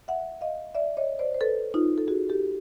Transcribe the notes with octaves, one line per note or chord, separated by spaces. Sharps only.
E5 F#5
D#5 F5
D5 E5
C#5 D#5
C5 D5
C5
A4 B4
D#4 F4
A4
F#4 G#4
G4 A4